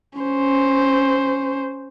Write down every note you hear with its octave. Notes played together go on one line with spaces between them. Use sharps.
C#4 C5